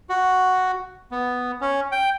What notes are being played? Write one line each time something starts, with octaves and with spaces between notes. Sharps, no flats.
F#4
B3
C#4
G5